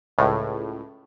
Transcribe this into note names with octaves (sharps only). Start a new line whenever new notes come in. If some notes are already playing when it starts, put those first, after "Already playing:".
C#2 A2